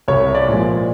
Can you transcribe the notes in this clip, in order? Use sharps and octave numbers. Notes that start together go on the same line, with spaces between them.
C2 C#5
D5
A#2 F3 G#3